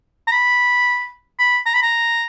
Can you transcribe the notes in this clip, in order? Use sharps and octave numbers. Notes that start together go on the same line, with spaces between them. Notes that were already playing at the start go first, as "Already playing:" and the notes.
A#5
B5
B5
A#5
B5
A#5